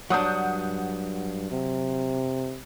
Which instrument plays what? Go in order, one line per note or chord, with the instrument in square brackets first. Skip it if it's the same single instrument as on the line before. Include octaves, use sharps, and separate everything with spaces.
[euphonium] G2 [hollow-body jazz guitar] F#3 D4 [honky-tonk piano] F#5 D#6 G6
[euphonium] C3